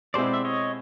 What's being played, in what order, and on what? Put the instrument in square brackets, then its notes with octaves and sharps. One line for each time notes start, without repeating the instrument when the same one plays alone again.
[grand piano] B2 G#3 C4 E4 [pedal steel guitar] C5 D5
[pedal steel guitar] E5
C#5 D#5